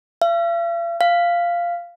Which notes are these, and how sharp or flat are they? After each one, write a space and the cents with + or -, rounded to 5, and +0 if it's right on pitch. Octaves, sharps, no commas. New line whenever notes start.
F5 -45
F5 -10